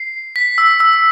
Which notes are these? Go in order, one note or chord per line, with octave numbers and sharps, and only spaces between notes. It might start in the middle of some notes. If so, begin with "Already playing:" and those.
Already playing: C7
B6
E6
E6